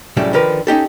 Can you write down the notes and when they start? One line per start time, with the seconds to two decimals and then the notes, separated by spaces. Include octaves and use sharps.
0.17 C2 A2 C#3 F#3 G3 E5
0.33 D3 D#3 F3 A#4 B4
0.67 C#4 D#4 G4 A4